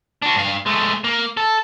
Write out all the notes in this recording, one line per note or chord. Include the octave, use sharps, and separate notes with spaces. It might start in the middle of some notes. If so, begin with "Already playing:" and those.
D4 F#4
G2 F5
G#3 A3
A#3
A4